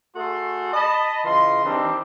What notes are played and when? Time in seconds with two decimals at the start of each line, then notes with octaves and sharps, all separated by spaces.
0.15 A3 F#4 G#4 A4 C6
0.73 D#5 A5 B5
1.24 C#3 E3 F4 D#5 C6
1.64 D#3 E3 G3 C4 D4